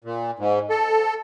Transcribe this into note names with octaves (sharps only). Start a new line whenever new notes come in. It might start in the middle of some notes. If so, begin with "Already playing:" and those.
A#2
G#2
A4